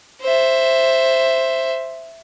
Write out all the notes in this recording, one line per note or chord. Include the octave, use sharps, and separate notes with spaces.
C5 E5